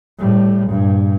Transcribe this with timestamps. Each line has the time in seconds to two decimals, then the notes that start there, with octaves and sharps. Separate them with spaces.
0.18 A2 G3
0.69 G2 A#2